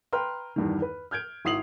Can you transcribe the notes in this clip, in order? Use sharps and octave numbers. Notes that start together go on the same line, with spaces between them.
B4 G5 A#5 C6 F6
E2 G2 D#3
B4
F6 G6 G#6 D7
G#1 E4 D#6 C7 F7 F#7